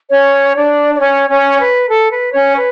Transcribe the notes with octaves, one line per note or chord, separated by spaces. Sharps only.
C#4 C#5
D4 D5
D5
C#4 C#5
C#4 C#5
B4
A4
B4
C#4 C#5
B4